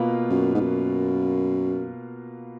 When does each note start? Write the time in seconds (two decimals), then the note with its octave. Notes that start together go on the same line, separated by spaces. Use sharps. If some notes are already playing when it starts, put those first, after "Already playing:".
Already playing: B2 A#3 F4 B4
0.30 F#2
0.54 G#2
0.61 F#2